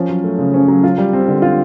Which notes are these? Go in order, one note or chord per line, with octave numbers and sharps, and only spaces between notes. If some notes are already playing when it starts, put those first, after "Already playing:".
Already playing: F3 C#4
F#3
A3
C#3
C#4
F#3
F4
G3
C4
D3
F4